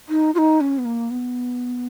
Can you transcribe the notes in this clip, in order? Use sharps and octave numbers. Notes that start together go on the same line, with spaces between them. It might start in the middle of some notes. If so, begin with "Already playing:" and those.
D#4
F4
D#4
C#4
B3
A#3
B3